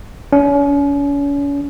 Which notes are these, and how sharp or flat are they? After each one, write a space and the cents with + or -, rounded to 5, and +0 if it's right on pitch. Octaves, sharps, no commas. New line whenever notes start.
C#4 +40